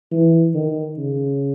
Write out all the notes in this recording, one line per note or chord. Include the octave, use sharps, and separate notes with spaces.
E3
D#3
C#3